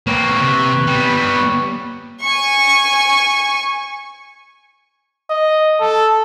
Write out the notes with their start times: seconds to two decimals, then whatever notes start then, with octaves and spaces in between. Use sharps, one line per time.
0.07 A#3 C4 B4 C#5
0.41 C3
0.87 G3 B3
2.21 G#5 C#6
5.30 D#5
5.81 A4